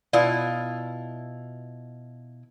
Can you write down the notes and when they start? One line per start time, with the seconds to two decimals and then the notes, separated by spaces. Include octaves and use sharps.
0.13 B2 E4 F4 D5